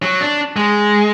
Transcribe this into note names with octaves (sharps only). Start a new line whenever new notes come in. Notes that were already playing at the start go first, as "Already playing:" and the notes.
F#3
D4
G#3